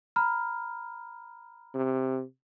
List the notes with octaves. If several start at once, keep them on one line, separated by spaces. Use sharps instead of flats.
A#5 B5 F6
C3